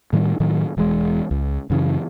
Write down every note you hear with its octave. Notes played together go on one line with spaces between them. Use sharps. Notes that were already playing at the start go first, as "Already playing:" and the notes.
A2 D#3 G3
A2 D#3 F#3
E1 E3 F3 G#3
C#2
F#2 C#3 E3